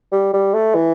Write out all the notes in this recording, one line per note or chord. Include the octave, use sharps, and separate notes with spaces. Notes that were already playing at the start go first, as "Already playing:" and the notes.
G3
G3
A3
E3